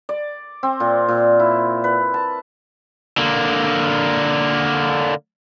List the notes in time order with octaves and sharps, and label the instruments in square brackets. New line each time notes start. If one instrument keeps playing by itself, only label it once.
[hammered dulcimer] D5
C4
A#2
A#2
E4
B4
A5
[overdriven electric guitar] D3 A#3